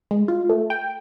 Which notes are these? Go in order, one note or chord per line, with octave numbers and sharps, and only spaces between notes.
G#3
F4
A3
G5